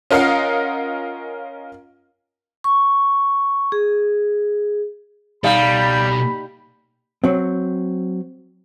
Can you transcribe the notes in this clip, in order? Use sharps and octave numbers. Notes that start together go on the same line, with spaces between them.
C#4 F4 A#4 D#5 F5 F#5
C#6
G#4
B2 G3 D#4 A4 F5 B5
F#3 C4